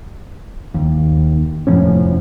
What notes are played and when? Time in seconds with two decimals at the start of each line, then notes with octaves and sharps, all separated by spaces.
0.74 D#2
1.67 F1 A2 F3 C#4